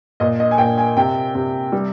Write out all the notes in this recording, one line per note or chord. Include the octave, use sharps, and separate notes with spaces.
A#2 D#5
D#5
G#5
A#2 G5
G#5
C3 G5
C3
G3